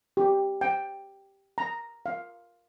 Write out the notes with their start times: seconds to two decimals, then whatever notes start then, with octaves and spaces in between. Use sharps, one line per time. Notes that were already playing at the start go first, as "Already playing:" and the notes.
0.17 G4
0.61 G5
1.58 A#5
2.06 F5